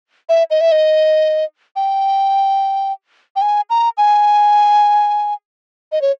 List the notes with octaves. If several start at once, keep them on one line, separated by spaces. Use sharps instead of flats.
E5
D#5
E5
D#5
G5
G5
G#5
A#5
G#5
D#5
C#5